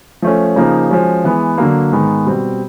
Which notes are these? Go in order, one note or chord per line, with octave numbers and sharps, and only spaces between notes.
F3 A3 C#4
C#3 F3 A#3 D#4
F3 G#3 C#4 F#4
E3 G#3 B3
D3 F#3 A#3
G#2 D#3 G#3 B3
B2 G3 C4